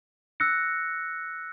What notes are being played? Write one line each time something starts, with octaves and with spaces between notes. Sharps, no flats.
E6 F#6 A#6 C#7